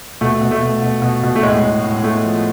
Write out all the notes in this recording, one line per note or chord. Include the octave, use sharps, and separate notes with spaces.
B2 A3
B2
A3
B2
B2
B2
B2
A3
A2 G#3
A2
A2
A2 A3
F3